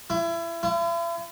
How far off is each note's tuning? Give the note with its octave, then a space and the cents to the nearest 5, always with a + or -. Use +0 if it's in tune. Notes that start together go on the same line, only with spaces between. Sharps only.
E4 +30
E4 +45